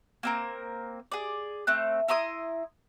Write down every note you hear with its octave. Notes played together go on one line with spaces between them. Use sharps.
A#3 C4 A#4
G#4 D5
A3 C4 F#6
E4 A#5 C6 D#6